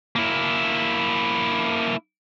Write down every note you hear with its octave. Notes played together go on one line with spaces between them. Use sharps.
A#3 E4